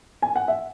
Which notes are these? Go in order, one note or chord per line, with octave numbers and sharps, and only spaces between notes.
G#5
F#5
E5